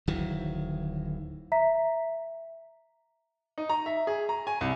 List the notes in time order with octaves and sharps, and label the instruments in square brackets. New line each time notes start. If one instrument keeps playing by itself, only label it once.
[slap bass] D1 D#3 E3 F#3
[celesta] E5 A#5 B6
[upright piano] D#4
A#5
E5
G#4
A#5
G#5
C2